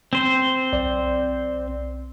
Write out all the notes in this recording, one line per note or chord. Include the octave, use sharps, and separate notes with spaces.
C4 C5
B1 D5